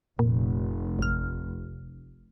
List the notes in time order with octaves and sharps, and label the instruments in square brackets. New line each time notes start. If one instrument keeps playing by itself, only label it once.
[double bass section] F1 [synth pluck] A#2
[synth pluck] G#1 F6